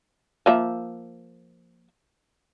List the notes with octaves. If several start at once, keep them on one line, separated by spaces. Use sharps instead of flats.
F3 A#3 E5